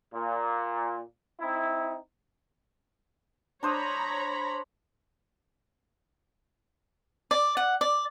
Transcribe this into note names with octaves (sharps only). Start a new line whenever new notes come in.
A#2
C4 D#4 E4
D4 C5 C#5 A#5 B5 D#6
D5
F#5
D5